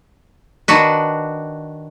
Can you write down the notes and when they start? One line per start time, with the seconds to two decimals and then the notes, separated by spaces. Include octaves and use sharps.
0.68 D#3 D4 F#4 B4